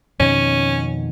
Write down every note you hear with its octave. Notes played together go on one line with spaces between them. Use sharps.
F2 B2 D#3 C#4